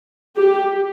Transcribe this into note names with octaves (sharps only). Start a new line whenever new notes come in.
G4